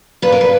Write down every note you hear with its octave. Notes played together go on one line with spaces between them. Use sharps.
A#2 B4
A#4
B4